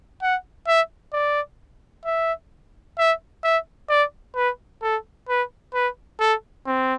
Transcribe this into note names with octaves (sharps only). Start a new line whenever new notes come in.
F#5
E5
D5
E5
E5
E5
D5
B4
A4
B4
B4
A4
C4